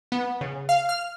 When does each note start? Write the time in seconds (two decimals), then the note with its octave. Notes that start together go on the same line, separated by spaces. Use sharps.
0.12 B3
0.41 C#3
0.69 F5
0.89 F6